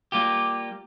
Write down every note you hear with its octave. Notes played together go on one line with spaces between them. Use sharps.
G3 A#3 F4 G4